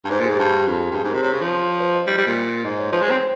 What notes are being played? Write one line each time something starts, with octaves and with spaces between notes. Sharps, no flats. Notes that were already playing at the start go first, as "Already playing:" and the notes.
G2
G#2 C5
A#2
G#2 G#4
G4
G2 G#4
G4
F2 G4
G#4
G4
F2
G2 G#4
G#2
C3 A#4
C3 C#5
C#3
F3
C5
D#5
G3
G3
A#2
G#2 D#5
C#5
F3 C5
G#3 C#5
C4 C5